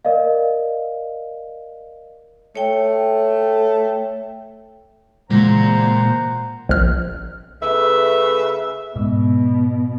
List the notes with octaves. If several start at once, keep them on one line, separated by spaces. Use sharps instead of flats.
A#4 D5 D#5 F5
A3 C#5 G5
A#2 C#3 E3 G#3 C5 F#5 A#5
A#1 F6
C#3 A3 B4 E5
G#2 B2